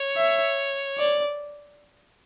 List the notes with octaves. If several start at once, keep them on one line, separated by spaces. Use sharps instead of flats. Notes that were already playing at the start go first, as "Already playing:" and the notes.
Already playing: C#5
E5
D5